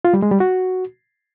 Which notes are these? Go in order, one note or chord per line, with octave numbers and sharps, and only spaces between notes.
F4
G3
G#3
G3
F#4